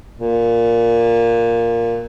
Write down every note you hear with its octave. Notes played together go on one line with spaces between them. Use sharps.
A#2